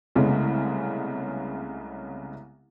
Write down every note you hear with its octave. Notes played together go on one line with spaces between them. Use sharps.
C2 C#3 G#3 A3 B3